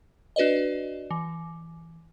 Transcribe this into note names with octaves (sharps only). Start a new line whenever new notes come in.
D4 F#4 B4 D5 D#5
E3